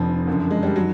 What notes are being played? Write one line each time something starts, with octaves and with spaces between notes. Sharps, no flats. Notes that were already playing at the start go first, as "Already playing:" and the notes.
Already playing: F1 F2 D3 F3
F#1 F#2 D3
G#3
G3
D#3 F#3